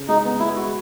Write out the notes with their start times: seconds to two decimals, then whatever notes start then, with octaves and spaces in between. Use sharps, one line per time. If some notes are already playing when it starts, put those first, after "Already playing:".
Already playing: C#3
0.08 G#3 D#4
0.25 B3
0.40 G#3 E4
0.56 F#4